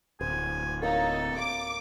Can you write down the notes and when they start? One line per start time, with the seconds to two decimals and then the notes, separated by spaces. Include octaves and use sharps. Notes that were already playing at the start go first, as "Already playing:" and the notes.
0.21 D1 C5 G#5
0.82 A#3 D#4 A4 C#5 D#6
1.36 A#5 D6